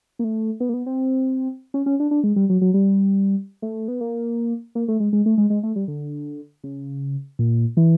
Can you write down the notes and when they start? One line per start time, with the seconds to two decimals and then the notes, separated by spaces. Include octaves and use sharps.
0.19 A#3
0.24 A3
0.60 B3
0.69 A#3
0.74 B3
0.86 C4
1.74 C#4
1.86 C#4
2.00 D4
2.11 D4
2.24 G#3
2.36 G3
2.50 F#3
2.61 F#3
2.74 G3
3.62 A3
3.88 B3
4.01 A#3
4.75 A#3
4.88 A3
5.00 G#3
5.13 G#3
5.26 A3
5.38 G#3
5.50 G#3
5.63 A3
5.76 G3
5.88 D3
6.64 C#3
7.39 A#2
7.77 E3